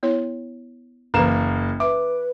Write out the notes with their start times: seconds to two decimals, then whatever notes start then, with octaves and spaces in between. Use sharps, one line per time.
0.03 B3 E4 C#5
1.14 F#1 E3 A#3 B4 A#5 E7
1.80 B4 E5 D6